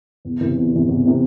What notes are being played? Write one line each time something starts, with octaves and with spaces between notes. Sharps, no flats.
E2
C3 E3
E2
C3 E3
E2
C3 E3